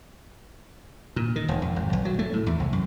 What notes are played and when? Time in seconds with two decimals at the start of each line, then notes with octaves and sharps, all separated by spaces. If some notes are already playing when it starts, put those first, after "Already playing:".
1.16 A#2
1.36 D#3
1.49 E1
1.62 F2
1.76 G#1
1.93 B1
2.05 F#3
2.19 A3
2.33 A2
2.47 E2
2.60 C2
2.73 F#2